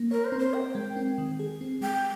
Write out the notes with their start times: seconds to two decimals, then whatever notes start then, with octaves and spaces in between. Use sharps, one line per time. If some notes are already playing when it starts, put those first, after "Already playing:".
Already playing: A#3
0.11 A#4 C#5
0.25 C5
0.32 C4
0.39 C5
0.53 A#4 G5
0.75 G#3
0.96 C4
1.18 D#3
1.39 G#4
1.61 C4
1.81 G#3 G5